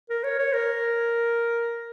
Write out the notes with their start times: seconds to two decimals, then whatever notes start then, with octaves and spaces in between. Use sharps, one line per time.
0.10 A#4
0.24 C#5
0.39 C#5
0.53 A#4